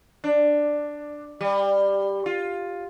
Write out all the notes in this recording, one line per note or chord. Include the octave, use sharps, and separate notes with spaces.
D4
G3
F4